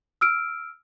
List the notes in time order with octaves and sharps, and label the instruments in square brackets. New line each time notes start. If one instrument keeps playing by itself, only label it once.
[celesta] E6 F6 D7